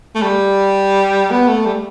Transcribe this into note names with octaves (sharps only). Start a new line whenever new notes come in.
A3
G3
B3
A3
G3